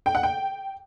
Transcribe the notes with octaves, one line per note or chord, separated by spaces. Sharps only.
G5
F#5
G5